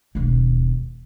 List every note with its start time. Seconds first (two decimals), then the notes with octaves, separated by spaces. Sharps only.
0.15 E1 D#2